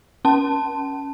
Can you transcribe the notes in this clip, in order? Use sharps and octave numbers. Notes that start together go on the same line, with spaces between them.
C#4 A5